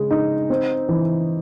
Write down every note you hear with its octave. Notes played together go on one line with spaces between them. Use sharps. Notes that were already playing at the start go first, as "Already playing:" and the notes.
Already playing: C#3 G#3
D#4
C4
E3